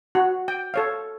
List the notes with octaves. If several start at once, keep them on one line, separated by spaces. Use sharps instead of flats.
F#4
G5
A4 C#5 F5